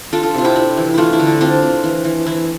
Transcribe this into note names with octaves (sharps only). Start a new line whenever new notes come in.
D4 F4 A4
F4 A4
C3 F4
E4 G4
D4
E3
A3 D4 E4 F4
E4
D3
D4
C4 D4 F4
C4
E3
E3
E3 E4